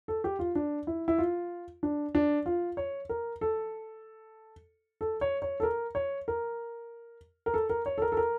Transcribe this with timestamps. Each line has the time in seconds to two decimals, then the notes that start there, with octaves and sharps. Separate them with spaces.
0.08 A4
0.24 G4
0.39 F4
0.55 D4
0.87 E4
1.08 E4
1.18 F4
1.83 D4
2.15 D4
2.46 F4
2.77 C#5
3.09 A#4
3.41 A4
5.01 A4
5.21 C#5
5.42 C#5
5.60 A4
5.63 A#4
5.95 C#5
6.28 A#4
7.46 A#4
7.54 A4
7.70 A#4
7.86 C#5
7.98 A4
8.02 A#4
8.12 A4
8.17 A#4